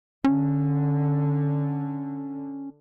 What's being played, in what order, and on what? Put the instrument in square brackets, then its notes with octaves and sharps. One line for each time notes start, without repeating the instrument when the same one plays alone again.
[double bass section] D3 [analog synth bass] C#4